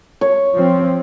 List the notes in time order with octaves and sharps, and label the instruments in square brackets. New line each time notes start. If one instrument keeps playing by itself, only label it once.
[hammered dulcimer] C#5
[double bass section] F3 C4